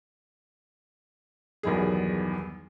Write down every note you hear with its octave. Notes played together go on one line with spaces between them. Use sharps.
B1 E2 G2 D#3 G#4